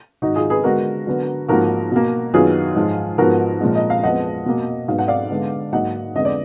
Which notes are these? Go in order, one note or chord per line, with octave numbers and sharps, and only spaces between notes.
G#2 D#3 G#3 D#4 F#4
F4 G#4
G#4 B4
D3 G#3 B3 F#4 A#4
D3 F#3 B3
G#2 F3 A#3 F#4 A#4
B2 A#3
F#2 D#3 F#3 B3 F4 G#4
G#2 F3 G#3
G#2 F3 B3 F#4 A#4
A#2 F3 G#3
D#5
F5
F2 F3 G#3 B3 D#5 F#5
B2 A#3
G#2 F#3 B3 F5
F#5
D5 F5
D3 G#3 B3
G#2 F#3 A#3 D#5 F#5
F2 D3 G#3 B3 D#5
D5